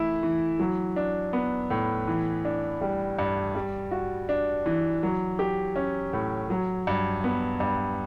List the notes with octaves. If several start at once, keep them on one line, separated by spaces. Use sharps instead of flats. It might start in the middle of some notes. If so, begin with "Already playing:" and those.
Already playing: E3 A3 E4
E3
F#3
D4
B3
A2
E3
D4
G3
G2
G3
F#4
D4
E3
F#3
G4
C#4
A2
F#3
G2
B3
G2